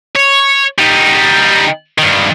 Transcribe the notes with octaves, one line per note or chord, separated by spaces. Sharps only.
C#5
G3 D#4
G2 D#3